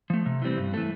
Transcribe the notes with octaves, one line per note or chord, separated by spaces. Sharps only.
F3 A3
C3
E3 G3 C4
G2
E3 A3